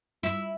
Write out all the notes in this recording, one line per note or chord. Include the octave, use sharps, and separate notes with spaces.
E4